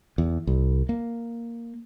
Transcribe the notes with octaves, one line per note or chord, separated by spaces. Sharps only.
E2
C2
A#3